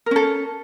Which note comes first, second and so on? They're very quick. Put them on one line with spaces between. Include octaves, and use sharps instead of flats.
A#4 C#4 A4